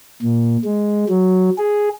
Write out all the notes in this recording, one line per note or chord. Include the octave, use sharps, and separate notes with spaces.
A#2
G#3
F#3
G#4